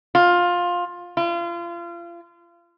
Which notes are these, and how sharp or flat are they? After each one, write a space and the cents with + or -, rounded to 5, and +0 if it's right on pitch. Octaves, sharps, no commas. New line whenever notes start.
F4 +15
F4 -30